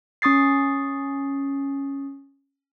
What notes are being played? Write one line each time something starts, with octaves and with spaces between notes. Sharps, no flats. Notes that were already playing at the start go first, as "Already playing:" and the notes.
C#4 C#6 D#6 A6 C7